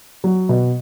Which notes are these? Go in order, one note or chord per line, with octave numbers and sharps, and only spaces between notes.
F#3
B2